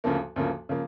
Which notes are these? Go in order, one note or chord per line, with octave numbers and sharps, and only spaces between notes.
D2 C#3 F3 A#3
D2 C#3 F3 A#3
C#3 F3 A#3